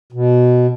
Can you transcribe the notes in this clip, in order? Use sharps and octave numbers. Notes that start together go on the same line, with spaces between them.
B2